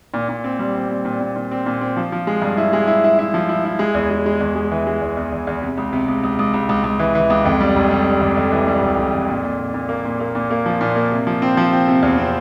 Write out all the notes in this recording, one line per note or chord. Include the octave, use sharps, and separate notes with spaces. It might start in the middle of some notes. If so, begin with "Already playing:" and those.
A#2
A#2
C4
G3
C4
G3
A#2
A#2
A#2
C4
A#2
C4
F3
F3
G#3
G2
E4
G#3
E4
E4
E4
F3
E4
E4
G#3
E2
G#3
G#3
E2
G#3
E3
G#3
E2
E2
E2
E2
C3
C#2
C3
C#2
C#2
C#2
C#2
C#2
C#2
E3
E3
C#2
F2
G3
F1
G3
G3
F2
F2
E3
G3
F1
F1
F2
A#2
A#2
A#2
A#2
A#3
A#2
A#3
A#2
A#3
F3
A#2
A#3
C3
F3
C4
F3
C4
C3
E2
C4